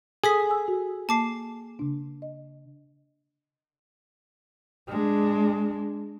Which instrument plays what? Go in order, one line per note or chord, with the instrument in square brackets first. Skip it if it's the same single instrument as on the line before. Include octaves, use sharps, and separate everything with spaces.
[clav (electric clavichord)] G#4 [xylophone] A4 D#6 B6
[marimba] G#5 E6
F#4
[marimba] A#3 [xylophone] A5 D6 C7
[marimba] C#3 D4
D#5
[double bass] G#3 D4